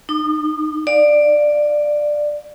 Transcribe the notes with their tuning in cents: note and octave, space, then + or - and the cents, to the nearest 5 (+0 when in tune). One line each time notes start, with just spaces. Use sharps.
D#4 -30 D6 +40
D5 +10 F5 +25